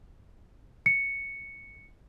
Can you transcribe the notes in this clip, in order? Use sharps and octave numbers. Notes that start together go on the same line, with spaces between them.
C#7